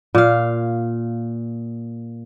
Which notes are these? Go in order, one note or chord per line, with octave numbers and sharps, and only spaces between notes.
A#2 F5